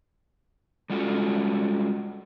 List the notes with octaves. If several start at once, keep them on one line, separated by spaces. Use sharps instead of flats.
G3 G#3 C#4 F4 F#4 A4